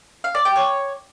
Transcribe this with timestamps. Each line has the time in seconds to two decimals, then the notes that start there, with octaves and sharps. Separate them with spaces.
0.24 F5
0.35 D5
0.45 G5
0.56 C#5